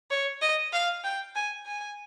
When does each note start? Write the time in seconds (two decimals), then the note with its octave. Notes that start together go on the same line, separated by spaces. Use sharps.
0.11 C#5
0.42 D#5
0.73 F5
1.04 G5
1.35 G#5
1.66 G#5